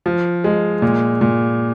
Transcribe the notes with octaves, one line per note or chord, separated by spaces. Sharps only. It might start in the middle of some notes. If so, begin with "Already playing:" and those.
F3
G#3
A#2
A#2